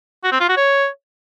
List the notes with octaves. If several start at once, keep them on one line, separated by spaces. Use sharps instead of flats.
F#4
C4
F4
F#4
C#5